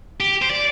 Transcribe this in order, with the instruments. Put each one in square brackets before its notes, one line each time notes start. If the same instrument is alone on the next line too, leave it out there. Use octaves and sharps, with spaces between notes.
[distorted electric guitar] G4
C5
D5